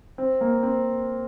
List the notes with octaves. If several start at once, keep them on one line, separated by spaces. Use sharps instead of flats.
C4
A#3
C4